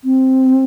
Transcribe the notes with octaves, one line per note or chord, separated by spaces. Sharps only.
C4